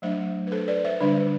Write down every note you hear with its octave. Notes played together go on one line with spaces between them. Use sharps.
F#3 A3 D4 C5 E5
B4
A4 C5
B4 D5
C5 E5
D3 G3 D4 B4 D5